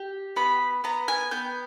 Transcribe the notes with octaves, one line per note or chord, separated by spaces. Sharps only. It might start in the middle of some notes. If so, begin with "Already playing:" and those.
Already playing: G4
B3 B5
B3 A#5
G#5
B3 G5